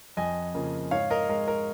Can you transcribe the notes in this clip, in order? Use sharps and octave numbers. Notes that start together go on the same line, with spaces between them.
F2 D#5 G#5
C#3 F3 A#3
G#2 C#5 F5
A#4 D#5
G#3 A#4
A#4